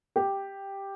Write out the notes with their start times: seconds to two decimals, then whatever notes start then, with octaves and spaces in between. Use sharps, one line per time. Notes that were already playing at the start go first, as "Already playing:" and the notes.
0.16 G4